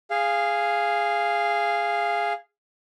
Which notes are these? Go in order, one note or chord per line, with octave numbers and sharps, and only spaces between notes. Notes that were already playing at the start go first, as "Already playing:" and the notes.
G#4 F5